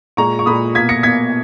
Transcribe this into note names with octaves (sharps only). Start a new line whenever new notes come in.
A#2 G#3 A#5 C#6
C#6
A#2 G#3 B5 D#6
B2 A#3 G#6 B6
A#6 C#7
B2 A#3 G#6 B6